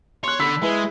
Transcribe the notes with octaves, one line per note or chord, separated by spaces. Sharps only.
C#5 C6 F#6
D3 B5 E6 B6
G#3 E4 B4